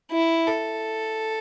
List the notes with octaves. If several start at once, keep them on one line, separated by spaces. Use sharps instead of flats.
E4
A4